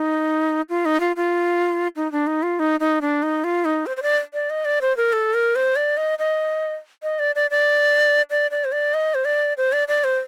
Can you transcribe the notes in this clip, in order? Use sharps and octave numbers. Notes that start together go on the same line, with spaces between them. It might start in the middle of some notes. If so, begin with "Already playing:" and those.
Already playing: D#4
F4
D#4
F4
F4
D#4
D4
D#4
F4
D#4
D#4
D4
D#4
F4
D#4
C5
C5
D5
D5
D#5
D5
C5
A#4
A4
A#4
C5
D5
D#5
D#5
D#5
D5
D5
D5
D5
D5
C5
D5
D#5
C5
D5
C5
D5
D5
C5